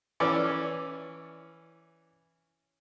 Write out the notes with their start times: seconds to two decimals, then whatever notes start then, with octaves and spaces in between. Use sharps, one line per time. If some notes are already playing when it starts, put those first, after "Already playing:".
0.20 E3 C#4 D5 C#6